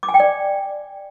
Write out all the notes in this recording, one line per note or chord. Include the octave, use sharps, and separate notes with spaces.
D6
G#5
G5
D5